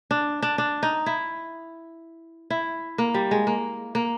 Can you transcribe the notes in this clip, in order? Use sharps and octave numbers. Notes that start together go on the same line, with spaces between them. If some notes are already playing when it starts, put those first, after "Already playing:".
D4
D4
D4
D#4
E4
E4
A#3
G3
G#3
A#3
A#3